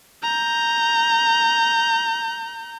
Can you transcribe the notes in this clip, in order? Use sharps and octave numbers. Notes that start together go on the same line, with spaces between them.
A#5 G6